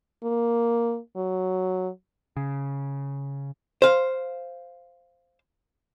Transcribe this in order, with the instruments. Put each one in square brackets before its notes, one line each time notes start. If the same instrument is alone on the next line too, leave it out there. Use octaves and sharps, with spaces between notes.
[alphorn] A#3
F#3
[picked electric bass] C#3
[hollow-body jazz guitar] C5 F5